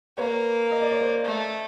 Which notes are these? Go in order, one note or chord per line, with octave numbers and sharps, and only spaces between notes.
A#3 B4 C#5
D#5
D5
C#5
C5 D5
A3